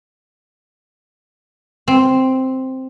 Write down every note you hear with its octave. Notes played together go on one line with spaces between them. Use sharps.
C4